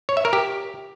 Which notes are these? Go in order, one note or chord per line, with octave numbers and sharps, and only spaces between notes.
C#5
E5
A#4
G4